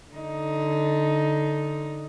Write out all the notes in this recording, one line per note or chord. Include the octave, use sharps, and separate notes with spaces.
D3 D#4